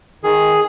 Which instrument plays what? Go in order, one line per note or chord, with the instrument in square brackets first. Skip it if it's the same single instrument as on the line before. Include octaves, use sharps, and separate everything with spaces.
[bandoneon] D#3 G#4